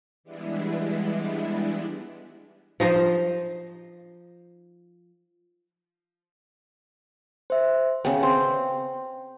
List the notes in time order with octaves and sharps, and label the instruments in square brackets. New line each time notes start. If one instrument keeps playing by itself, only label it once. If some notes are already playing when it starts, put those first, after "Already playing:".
[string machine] E3 G3 G#3 B3 D4 E4
[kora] F3 D#4 C5
[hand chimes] C5 E5
[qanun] C#3 B3 [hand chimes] G5
[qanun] C4